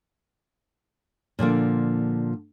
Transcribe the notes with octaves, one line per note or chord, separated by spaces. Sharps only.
A#2 D3 F3 A#3